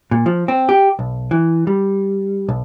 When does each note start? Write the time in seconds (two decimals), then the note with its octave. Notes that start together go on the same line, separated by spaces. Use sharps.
0.11 A#2
0.26 F3
0.48 C4
0.69 G4
0.99 B1
1.31 E3
1.67 G3
2.49 B1